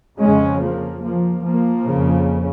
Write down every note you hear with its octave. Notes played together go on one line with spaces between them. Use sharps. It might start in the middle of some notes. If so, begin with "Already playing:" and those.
F2 C#3 G#3 C#4
F3 A#3
F3 A#3
F3 A#3
F2 C#3